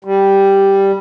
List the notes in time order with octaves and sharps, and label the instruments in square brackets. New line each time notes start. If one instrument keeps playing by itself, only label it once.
[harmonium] G3